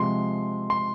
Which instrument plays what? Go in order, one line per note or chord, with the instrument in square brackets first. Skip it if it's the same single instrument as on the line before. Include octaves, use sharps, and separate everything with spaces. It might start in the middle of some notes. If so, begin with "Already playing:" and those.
Already playing: [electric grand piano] C3 F3 G#3 C6
C6